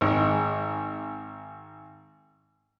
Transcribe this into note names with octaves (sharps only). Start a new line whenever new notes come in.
G#1 G#3